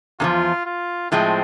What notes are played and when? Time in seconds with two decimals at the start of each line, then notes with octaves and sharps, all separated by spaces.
0.20 E2 D3 F3 F4
0.66 F4
1.11 A2 F3 G#3 C4